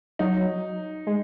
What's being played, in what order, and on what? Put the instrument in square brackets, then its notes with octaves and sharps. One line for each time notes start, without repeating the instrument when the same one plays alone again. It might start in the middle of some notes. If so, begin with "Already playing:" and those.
[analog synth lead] F#3 [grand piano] D#4
[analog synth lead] G#3